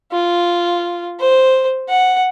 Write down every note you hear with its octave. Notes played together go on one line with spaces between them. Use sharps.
F4
C5
F#5